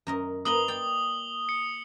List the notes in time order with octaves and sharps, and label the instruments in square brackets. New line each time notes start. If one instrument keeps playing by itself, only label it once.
[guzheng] F#2 A#4 D#5
[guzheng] A#3 B4 D#5 [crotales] D#6 F#7 G7
[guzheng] D5 G5
[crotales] C#7